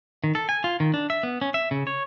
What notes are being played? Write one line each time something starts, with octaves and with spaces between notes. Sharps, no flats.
D#3
A4
G#5
F4
D#3
D4
E5
B3
C#4
E5
C#3
C#5